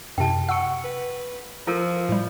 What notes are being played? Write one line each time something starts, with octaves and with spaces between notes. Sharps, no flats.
F#2 C3 G5 A5
F#5 C#6 E6 C#7
B4
F3 F4 A4 A#4
A2 G3